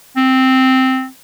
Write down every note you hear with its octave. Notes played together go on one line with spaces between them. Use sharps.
C4